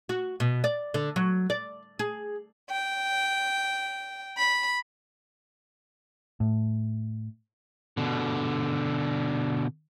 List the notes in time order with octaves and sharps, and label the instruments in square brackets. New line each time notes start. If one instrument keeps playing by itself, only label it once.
[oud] F#4
B2
D5
D3
F#3
D5
G#4
[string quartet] G5
B5
[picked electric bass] A2
[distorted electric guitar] B2 D3